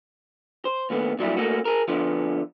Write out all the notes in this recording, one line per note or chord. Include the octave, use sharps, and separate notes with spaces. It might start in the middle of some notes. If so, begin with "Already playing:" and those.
C5
D#2 A3 B3
A#2 F#3 G3 E4
A3 A#3 C#4 F#4
G#4 A#4
D3 F3 B3